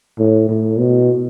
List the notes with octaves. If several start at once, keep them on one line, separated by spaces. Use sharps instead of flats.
A2
A2
B2